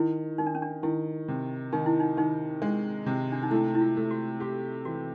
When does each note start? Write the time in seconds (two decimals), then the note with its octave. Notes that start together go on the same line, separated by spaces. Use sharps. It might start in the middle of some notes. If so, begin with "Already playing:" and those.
Already playing: D#3 E4
0.38 D#3 D#4
0.47 D4
0.55 C#4
0.62 D4
0.83 D#3 E4
1.28 C3
1.73 D#3 D#4
1.86 E4
2.00 D#4
2.17 D#3 D#4
2.62 G#3 D4
3.06 C3
3.32 D4
3.43 D#4
3.51 A3 E4
3.75 E4
3.81 F4
3.97 A3
4.11 F#4
4.40 F#4 G4
4.85 E3 F#4